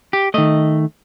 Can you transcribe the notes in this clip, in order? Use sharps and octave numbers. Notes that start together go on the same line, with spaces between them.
G4
D#3 A3 D#5